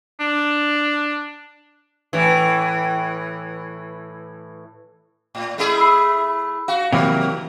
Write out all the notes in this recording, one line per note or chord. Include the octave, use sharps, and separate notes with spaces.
D4
A2 E3
A2
A3 E4 G#4
B5 E6 C7
F#4 F5
C3 D#3 F#3 A#3